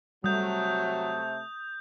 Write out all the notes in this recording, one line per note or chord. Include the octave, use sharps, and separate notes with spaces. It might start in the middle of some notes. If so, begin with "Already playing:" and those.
C3 F#3 G3 A3 D#6 G6